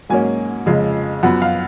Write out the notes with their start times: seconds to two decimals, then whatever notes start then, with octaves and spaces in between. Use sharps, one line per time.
0.09 G#2 F#3 A#3 C#4 G#5
0.66 F2 C#3 F3 G#3
1.23 F#2 F3 B3 F#5
1.42 F5